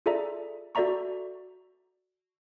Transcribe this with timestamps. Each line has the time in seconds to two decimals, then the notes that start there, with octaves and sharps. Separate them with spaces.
0.06 F4 G#4 A4 D5 E5 A#5
0.75 F#4 A4 D5 E5 A#5 C#6